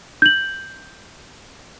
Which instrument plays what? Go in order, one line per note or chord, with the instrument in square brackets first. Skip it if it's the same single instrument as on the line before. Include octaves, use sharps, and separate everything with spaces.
[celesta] G6 F#7